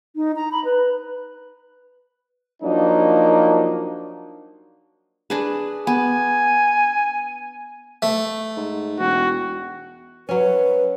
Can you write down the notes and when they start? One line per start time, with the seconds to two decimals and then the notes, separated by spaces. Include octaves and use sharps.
0.16 D#4
0.36 A#5
0.52 B5
0.65 B4
2.62 F3 F#3 A#3 D4 D#4
5.30 D4 G#4 B4
5.87 B3 G#5
8.02 A3
8.57 G#2
9.00 E1 F#4
10.29 F#3 C#4 B4